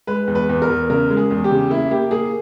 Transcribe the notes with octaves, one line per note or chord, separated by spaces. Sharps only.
G#3 B4
E2
B4
E2
A#4
E2
C#3 A#4
G#3
G#4
E2
G4
C#3
A#3 E4
A#3 G4
A#3 G#4